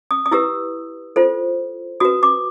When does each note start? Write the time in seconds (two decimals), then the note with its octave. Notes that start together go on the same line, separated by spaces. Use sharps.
0.11 D#6
0.26 D#6
0.32 E4 G4 B4 E6
1.16 F4 A4 C5
2.00 F#4 B4 D#6
2.23 D6